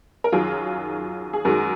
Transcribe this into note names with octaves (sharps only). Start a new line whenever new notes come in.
A#4
F#2 D#3 F#3 F4 G#4
G#4
F#2 D#3 G#3 F#4 A#4